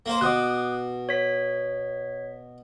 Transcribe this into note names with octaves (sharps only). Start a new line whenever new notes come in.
A#3 C5
B2 D6 D#6 F#6
C#5 B6